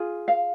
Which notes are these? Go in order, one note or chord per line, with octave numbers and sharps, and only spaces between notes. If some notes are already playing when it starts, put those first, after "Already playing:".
Already playing: F4 G#4
F5